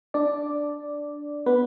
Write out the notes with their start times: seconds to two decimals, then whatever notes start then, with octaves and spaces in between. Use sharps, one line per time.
0.14 D4 D5
1.46 B3 B4